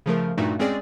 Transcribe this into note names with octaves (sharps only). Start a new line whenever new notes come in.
C#3 F3 A3 A#4
G2 A#2 A3 D#4 F#4
G#3 C4 C#4 G#4 D5